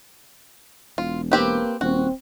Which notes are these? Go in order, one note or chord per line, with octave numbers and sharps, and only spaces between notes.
E1 F4
A#3 C4 G4 B4
D#1 C4 F#4